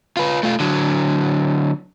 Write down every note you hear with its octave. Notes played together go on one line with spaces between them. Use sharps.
F4 B4
A3 F4
D3 F#3